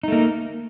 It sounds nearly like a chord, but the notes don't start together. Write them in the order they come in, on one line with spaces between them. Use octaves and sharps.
D#4 A3 A#3